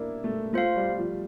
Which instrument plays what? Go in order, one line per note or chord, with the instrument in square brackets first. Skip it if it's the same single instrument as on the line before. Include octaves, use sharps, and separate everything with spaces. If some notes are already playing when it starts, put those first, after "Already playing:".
Already playing: [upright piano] A#3 D4 E4
A3
[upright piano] A3 [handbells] F4 C5 F5
[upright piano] G3
F3